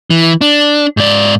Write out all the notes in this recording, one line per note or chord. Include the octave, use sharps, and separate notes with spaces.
E3
D4
G#2 D5